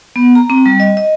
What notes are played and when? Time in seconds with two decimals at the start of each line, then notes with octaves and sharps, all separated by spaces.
0.16 B3
0.35 A#5
0.50 C4
0.66 G3
0.80 D#5
0.97 D#5